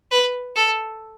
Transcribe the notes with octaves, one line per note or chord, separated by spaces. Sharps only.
B4
A4